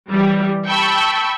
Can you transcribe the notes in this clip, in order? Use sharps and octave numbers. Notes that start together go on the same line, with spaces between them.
E3 G3
G5 A5 B5 C#6 E6